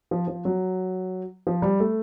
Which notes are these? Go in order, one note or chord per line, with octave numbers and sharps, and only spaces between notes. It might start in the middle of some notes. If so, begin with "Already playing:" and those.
F3
F3
F#3
F3
G3
A3